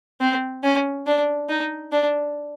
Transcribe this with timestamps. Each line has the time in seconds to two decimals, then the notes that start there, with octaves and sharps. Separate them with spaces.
0.21 C4
0.64 C#4
1.07 D4
1.49 D#4
1.92 D4